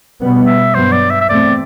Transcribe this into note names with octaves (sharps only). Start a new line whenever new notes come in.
B2 G3 B3
E5
G2 F#3 B3 C5
D5
E5
E5
E2 B2 A3 C4 D5